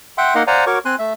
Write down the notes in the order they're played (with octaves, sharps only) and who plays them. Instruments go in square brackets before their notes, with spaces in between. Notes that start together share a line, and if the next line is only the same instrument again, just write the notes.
[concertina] E5 F#5 G5 C6
A#3 D#4 A#4 D#5 F5 F#5
C5 D5 F5 F#5 G#5 A#5
F#4 A#4 C#5 C#6 D6
C4 G#5 C6 F#6
A3 E5